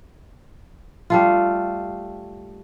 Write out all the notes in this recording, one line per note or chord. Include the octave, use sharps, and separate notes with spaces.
G3 A3 F4